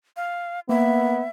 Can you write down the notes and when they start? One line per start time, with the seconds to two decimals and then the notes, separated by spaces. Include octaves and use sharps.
0.17 F5
0.69 A#3 B3 E5